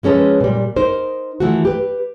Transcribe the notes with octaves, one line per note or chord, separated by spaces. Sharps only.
F3 G#3 C#4 A4 B4
A#2 G3
D#4 A#4 C5
D#3 E3 A3 F4 F#4
G4 B4